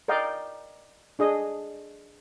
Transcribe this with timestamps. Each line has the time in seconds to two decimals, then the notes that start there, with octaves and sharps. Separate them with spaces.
0.08 A#4 D5 D#5 F5 G5
1.19 D4 G#4 D#5